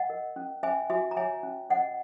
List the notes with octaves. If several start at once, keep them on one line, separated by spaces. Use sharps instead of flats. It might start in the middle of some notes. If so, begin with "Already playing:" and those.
Already playing: D#5 F#5
A#4
C#4
C#4 E5 G#5
F#4 E5 G#5
A#5
C#5 E5 G#5
C#4
C#4 D#5 F#5